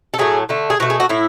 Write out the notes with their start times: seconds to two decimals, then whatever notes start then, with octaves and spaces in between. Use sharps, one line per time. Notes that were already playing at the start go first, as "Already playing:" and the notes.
0.14 A4
0.18 A2 F#3 A3 G#4
0.49 D3 A3
0.70 G#4
0.80 B2 A3 F#4
0.90 G#4
1.00 F#4
1.09 A2 E4